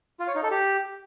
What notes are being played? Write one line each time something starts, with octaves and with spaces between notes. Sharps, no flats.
F4
C#5
D#4
A4
G4